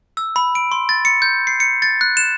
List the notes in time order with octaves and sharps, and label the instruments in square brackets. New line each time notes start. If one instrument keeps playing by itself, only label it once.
[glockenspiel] E6
B5
D7
C6
A6
C#7
G6
C7
C#7
A6
F#6
E7